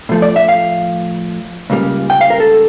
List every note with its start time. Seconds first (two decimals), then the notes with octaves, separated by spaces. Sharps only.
0.09 A2 F3 A3
0.22 D5
0.36 E5
0.49 F5
1.70 C#2 C#3 G3 A#3
2.10 G5
2.21 F5
2.30 A#4
2.40 A4